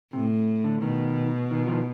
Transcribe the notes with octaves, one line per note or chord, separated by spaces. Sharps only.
A2 C3
D3
B2 D#3
D#3
D#3 F3